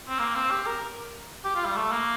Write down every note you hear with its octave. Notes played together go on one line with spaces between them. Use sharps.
C4
A#3
C4
G4
A#4
G4
F4
G3
A3
A#3